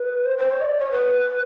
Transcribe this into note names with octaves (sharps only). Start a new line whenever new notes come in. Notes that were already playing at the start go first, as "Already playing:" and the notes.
Already playing: B4
C5
C5
C#5
D#5
D5
C#5
B4